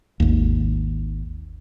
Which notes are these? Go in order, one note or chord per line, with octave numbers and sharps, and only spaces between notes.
G#1 D#2